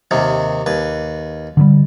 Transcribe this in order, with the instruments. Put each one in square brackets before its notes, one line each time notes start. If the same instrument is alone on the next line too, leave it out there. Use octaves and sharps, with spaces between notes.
[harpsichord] D#2 C3 D#3
D#2 B4
[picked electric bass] D3 D#3 G3